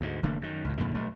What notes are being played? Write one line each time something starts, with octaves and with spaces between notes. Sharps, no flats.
D2 G#2
F1 D3 A3 A#3
F#2 D#3
C#2 A2
F2 A#2 D3 D#3
B1 G2 A3